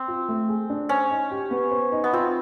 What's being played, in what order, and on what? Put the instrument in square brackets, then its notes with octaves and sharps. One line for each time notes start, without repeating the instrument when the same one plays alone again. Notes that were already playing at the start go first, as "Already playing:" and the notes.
Already playing: [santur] C4
[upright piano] F4
A3
G#4
D4
[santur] C#4 [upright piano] C5
[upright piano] D#4
G4
B3
C5
D#4
[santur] B3
[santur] C4 [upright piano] F4